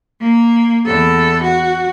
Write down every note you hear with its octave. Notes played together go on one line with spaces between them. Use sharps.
A#3
E2 A4
F#4